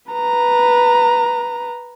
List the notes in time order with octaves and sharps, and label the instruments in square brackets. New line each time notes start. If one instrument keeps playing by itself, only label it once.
[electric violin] B4 A#5